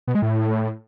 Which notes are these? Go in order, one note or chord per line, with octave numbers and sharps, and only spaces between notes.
B2
G#3
A2